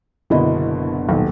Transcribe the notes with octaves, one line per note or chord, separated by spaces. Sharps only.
F#1 B2 D3 B3 E4 D#5
D#1 B1